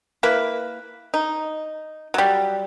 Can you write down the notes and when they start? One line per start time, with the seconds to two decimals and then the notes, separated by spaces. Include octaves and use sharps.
0.23 A#3 E4 B4
1.14 D#4
2.14 F#3 G3